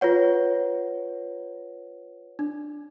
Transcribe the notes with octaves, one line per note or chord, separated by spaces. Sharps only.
F4 B4 C#5 F#5
D4